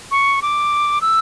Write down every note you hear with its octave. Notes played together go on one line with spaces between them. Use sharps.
C#6
D6
E6